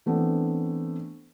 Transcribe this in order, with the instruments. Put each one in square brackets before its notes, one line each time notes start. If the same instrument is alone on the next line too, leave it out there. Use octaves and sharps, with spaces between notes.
[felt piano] E3 A3 B3 C4 D4